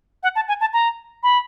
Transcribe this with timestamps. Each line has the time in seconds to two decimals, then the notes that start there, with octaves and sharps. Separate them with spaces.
0.23 F#5
0.35 A5
0.48 G#5
0.60 A5
0.73 A#5
1.23 B5